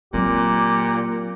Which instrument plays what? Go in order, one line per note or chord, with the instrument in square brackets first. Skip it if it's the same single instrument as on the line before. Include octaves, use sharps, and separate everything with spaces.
[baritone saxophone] A#2 [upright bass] F#3 C4 [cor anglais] G4